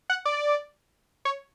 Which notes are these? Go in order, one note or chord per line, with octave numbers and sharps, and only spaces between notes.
F#5
D5
C#5